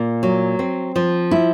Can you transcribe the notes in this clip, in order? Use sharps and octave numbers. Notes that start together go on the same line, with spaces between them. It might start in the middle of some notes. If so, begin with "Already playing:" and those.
Already playing: A#2
F#3
C4
F3
E4